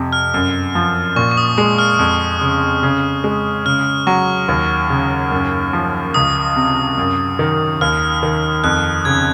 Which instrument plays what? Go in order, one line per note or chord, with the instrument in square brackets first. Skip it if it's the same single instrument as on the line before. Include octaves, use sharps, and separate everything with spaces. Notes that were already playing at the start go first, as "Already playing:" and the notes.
Already playing: [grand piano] F2 C3
[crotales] F6
[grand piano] F#2
F3
[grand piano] A#2 [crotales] C#6
[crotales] C#6
D#6
[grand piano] G#3 [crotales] D#6
[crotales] F6
[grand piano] F2
C#3
C#3
G#3
[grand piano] C#3 [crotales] F6
[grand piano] F#3 [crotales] C#6
[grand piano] D#2
C#3
F#2
F3
[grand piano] C#2 [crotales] D#6
[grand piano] C3
F#2
D#3
[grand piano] D#2 [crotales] F6
[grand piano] D#3
[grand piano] F2 [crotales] F#6
[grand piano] C#3 [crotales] G#6